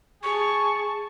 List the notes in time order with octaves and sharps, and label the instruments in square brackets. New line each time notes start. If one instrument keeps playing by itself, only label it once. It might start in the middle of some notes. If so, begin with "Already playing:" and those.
[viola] G#4 A5 [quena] C#6